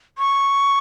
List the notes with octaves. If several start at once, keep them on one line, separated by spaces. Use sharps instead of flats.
C#6